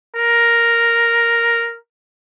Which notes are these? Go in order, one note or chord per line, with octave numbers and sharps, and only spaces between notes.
A#4